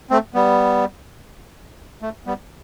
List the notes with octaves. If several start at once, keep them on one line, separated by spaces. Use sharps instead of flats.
A3 C4
G3 B3
A3
G3 B3